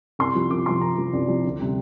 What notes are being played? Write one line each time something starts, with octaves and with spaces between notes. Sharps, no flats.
C2 C6
C3 F3
C2 D6
C3 F3 C6
C2 A#5
C3 F3
C2 D5
C3 F3
D2
C3 G3